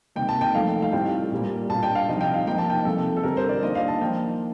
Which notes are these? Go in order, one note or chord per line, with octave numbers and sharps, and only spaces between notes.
C3 D#3 A#3 G5
A5
G5
F3 A3 D#4 F5
F5
A2 G3 C4 F4 G5
A#2 G3 A#3
A#2 G3 D4 F4 A5
G5
F5
C3 F3 C4 D#4 D#5
G5
F5
F3 A#3 D#4 G5
A5
G5
C3 F3 C4 A4
A4
D3 G3 C4 A#4
C5
D5
D#3 A#3 D4 F4 D#5
F5
A5
F3 A#3 D#4 G5